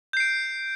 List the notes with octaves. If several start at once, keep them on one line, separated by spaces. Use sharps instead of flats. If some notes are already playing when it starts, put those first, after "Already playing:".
G6 C7 D7